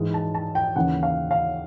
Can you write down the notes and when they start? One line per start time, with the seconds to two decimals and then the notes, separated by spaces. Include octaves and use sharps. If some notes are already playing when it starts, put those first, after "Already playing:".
Already playing: G#2 E3 G#3
0.14 A5
0.35 A5
0.55 G5
0.76 D#2 C#3 E3 F#5
1.03 F5
1.31 F5